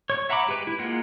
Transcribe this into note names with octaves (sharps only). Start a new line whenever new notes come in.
C#5 C#6
E5 F#5 A#5 B5 D6
G#3 G4 B4
E4
G#3 A#3 F4 F#5